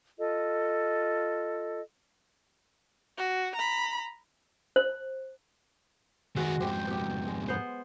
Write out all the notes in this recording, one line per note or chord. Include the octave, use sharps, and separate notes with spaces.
F4 A4 D#5
F#4
A#5 B5
C5
D#3 G#3 B3 F#4 E5
F2 G#2 G4 C5
B2 G4
G#3
B3 C5